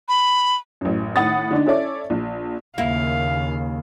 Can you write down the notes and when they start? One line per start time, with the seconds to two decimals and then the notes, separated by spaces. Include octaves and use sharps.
0.08 B5
0.81 A1 F#2
1.16 A2 D#3 F#5 B5 D#6 A6
1.51 D3 D4 D#4
1.66 C#4 E4 A4 C#5 D5
2.10 A#1
2.78 D#2 C#3 A#3 E4 F5